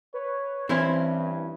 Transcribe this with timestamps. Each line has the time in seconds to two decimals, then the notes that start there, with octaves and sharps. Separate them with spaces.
0.14 B4 C#5
0.69 G2 E3 C4 C#4 E4 C5